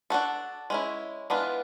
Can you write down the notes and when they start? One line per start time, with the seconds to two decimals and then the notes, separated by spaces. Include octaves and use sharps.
0.10 D4 F#4 A4
0.70 G#3 C#4 E4
1.30 E3 G#3 B3 D4 F4